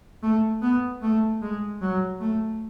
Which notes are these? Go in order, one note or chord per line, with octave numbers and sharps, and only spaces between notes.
A3
B3
A3
G#3
F#3
A3